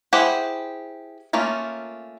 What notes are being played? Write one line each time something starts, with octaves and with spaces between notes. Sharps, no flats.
E4 G4 G#4 C5 F#5
A3 A#3 C#4 F4